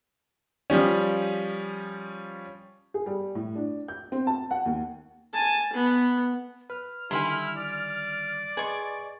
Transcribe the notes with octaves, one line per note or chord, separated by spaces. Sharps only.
F3 G3 C#4
G#4
G3
A2
D4
G6
C4
A5
F#5
D#2
G#5 A5
B3
B4 F6
D3 D#3 G3 E4 G#5 B5 C6
D5
G#4 B4 D#5 C6 C#6